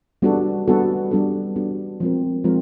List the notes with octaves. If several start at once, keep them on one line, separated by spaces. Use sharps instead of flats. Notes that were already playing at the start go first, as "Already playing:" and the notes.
G3 B3 D4 F#4 A4
G3 B3 D4 F#4 A4
G3 B3 D4 F#4 A4
G3 B3 D4 F#4 A4
F3 G#3 C4 F4 A#4
F3 G#3 C4 F4 A#4